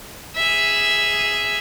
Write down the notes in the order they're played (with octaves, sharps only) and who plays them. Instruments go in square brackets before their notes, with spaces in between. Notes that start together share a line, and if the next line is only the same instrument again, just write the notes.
[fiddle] G#4 E5